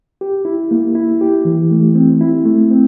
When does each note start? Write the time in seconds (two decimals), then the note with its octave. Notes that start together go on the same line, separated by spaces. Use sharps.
0.21 G4
0.45 E4
0.71 A#3
0.95 E4
1.21 G4
1.45 E3
1.71 A3
1.95 C4
2.21 E4
2.45 A3
2.71 C4